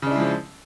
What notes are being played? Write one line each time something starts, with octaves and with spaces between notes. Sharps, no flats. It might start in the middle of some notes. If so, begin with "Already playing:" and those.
C#3 F3 G#3 D4 E4